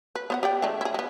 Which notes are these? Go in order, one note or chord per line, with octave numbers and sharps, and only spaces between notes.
B4
B3 C5 F#5
G4 D5 G5
D3 G#3 A3
E4 G#4
G#3 B3